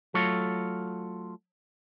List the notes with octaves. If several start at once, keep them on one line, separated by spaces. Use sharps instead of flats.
F#3 A3 F4 A4 C#5